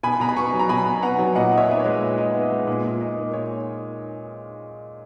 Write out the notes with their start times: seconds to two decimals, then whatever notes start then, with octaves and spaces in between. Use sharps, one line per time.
0.03 B2 G#5 B5
0.20 B2 A#5
0.29 B5
0.36 B3 A#5 C#6
0.53 F#3
0.59 A#5
0.69 B2 G#5 B5
0.86 B2
1.02 B3 F#5 A#5
1.19 F#3
1.35 A#2 D#5 F#5
1.52 D#4
1.57 C#5 E5
1.69 B3 B4
1.80 C#5
1.85 G#3
2.02 A#2
2.18 D#4
2.35 B3
2.51 G#3
2.67 A#2
2.84 A#2
3.01 D#4
3.17 A#3
3.33 A#2 C#5